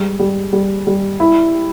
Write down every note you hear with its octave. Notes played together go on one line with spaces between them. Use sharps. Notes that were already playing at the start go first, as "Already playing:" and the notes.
Already playing: G3 G#3
G3
G3
G3
E4